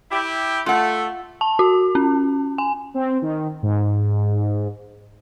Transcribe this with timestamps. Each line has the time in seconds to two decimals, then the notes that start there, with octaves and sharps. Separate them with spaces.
0.11 E4 G4
0.66 A3 F4 F#5
1.41 A5
1.59 F#4
1.95 C#4
2.58 G#5
2.94 C4
3.22 D#3
3.63 G#2